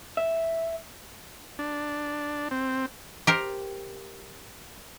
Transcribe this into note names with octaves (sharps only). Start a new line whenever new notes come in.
E5
D4
C4
G4 A#4 C5